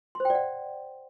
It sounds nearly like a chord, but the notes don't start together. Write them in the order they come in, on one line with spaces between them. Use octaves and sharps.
C6 C5 G5 D5 F#5